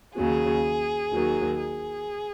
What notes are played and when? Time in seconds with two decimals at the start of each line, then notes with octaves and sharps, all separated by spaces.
0.16 D#2 C#3 F#3 G#4
1.12 D#2 D#3 F#3
1.59 G#4